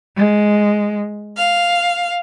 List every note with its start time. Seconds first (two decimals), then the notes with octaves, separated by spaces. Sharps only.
0.16 G#3
1.36 F5